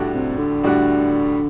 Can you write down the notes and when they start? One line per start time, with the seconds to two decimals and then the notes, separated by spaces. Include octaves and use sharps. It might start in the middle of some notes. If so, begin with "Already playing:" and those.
Already playing: A2 G3 D4 F#4
0.14 C3
0.38 D3
0.63 A2 G3 D4 F#4